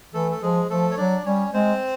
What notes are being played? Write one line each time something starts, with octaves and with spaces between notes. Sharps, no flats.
E3 A3 A4
A4
F3 G#3 G#4
F3 A3 A4
C#5
F#3 D4 D5
G3 C#4 C#5
G#3 C4 C5